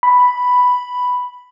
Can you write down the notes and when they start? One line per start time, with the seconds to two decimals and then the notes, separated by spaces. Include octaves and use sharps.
0.03 B5